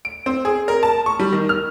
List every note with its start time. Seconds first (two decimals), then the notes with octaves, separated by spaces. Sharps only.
0.05 D7
0.26 C4
0.45 G#4
0.68 A#4
0.83 A5
1.06 C#6
1.19 G3
1.33 D#3
1.49 F6